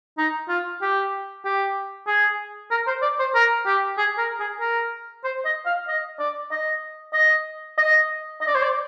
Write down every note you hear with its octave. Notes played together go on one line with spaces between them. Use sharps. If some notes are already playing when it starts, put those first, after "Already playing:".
D#4
F4
G4
G4
G#4
A#4
C5
D5
C5
A#4
G4
G#4
A#4
G#4
A#4
C5
D#5
F5
D#5
D5
D#5
D#5
D#5
D#5
D5
C5
D5